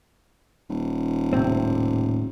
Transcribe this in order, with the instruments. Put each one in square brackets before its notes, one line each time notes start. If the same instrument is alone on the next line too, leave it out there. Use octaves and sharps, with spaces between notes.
[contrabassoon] D#1
[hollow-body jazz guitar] A2 C3 C4